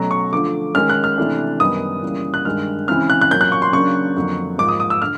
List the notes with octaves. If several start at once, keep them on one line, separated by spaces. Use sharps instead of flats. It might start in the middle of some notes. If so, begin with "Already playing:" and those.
Already playing: B2 F#3 A3 C#4 A#5
C#6
D3 F3 A3 D6
D#3 G#3 C#4 F6
F#6
F6
C3 E3 A3 D4
F#2 D#3 G3 B3 D#4 D#6
C#3 E3 G3 A#3
F#6
G2 D#3 G#3 F6
C#3 E3 G#3 C4 F6
F#6
F#6
A#2 F#3 A#3 C#4 G6
F#6
C#6
C6
C#3 F#3 A#3 D4 C#6
F2 D3 F#3 A#3
G#2 F3 A#3 D6
D#6
D#6
E6
D3 F6